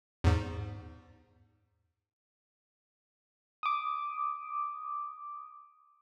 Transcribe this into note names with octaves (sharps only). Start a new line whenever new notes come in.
E2 G#2
D6 D#6